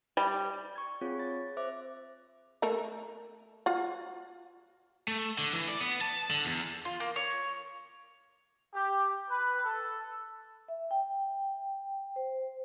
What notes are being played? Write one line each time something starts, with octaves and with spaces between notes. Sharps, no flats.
G3
C#6 G#6
C4 F4 G#4 C#5
A6
C5 E5 D6
A3 A4 A#4
F4 F#4
A3
D3
E3
D5
B3
A5
D3
E2
F4
A#3
C#5
G4
B4
A4
E5
G5
C5